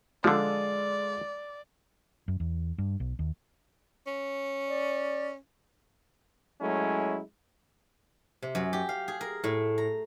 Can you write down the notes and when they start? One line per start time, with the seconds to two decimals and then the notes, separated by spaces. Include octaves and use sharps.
0.24 D3 F3 G#3 F4 A4 D5
2.28 F#2
2.40 E2
2.78 G2
3.00 B1
3.19 D#2
4.07 C#4
4.69 D5
6.61 F#3 G#3 A3 C#4 E4
8.42 C3
8.55 F#2
8.73 G4
8.89 F5
9.08 G#4
9.21 A#4
9.44 A2
9.78 A#5